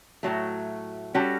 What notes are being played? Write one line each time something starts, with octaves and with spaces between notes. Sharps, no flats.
A2 F#3 A3
G3 C#4 F#4 A4